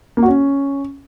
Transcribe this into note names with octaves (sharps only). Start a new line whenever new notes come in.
A#3
F#4
C#4